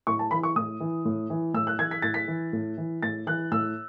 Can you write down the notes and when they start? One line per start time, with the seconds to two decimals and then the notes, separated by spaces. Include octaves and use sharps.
0.07 A2 C#6
0.19 A5
0.31 E3 B5
0.43 C#6
0.56 A2 D#6
0.80 E3
1.05 A2
1.30 E3
1.54 A2 E6
1.67 F#6
1.79 E3 G#6
1.91 B6
2.02 A2 A6
2.14 B6
2.28 E3
2.53 A2
2.78 E3
3.03 A2 A6
3.27 E3 F#6
3.51 A2 E6